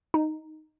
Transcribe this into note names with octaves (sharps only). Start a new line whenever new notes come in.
D#4